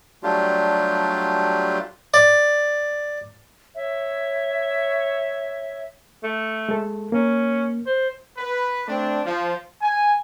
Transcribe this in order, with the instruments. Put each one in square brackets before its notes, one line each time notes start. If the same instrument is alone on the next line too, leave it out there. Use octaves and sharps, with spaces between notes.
[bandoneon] F#3 G3 A3 D4 F4 G4
[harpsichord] D5
[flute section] C#5 E5
[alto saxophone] A3
[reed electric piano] G#3 A4
[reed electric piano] A#3 [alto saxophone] C#4
[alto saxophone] C5
[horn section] B4
A3 C4 D4
F3
[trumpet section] G#5